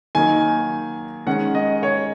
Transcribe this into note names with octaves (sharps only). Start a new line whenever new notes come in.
D#3 F#3 A#3 D#4 G#5
D#3 G#3 C#4 F#5
D#5
C#5